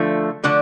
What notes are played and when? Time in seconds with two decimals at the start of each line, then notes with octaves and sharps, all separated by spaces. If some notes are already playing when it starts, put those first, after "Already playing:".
Already playing: D3 F3 A3
0.44 D3 F3 A3 D4